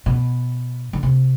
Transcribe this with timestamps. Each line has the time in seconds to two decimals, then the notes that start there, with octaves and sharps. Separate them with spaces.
0.06 B2
0.93 D3
1.03 C3